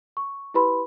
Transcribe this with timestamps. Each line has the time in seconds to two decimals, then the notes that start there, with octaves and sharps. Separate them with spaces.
0.17 C#6
0.54 E4 G4 B4 B5 C6